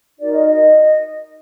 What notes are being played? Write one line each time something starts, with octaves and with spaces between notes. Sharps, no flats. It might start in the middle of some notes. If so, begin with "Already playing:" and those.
D#4 F#4 A#4 D5
D#5
D#5